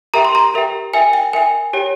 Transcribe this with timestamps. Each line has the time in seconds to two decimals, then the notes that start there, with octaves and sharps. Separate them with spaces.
0.14 G4 A#4 E5 G5 A#5
0.25 C6
0.35 A#5
0.54 G4 A#4 E5 G5
0.93 A#4 E5 G5 G#5
1.13 G5
1.33 A#4 E5 G5 G#5
1.73 G4 C#5 G5